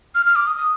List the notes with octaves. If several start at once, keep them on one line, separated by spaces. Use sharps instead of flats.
F6
F6
D6
D#6
D#6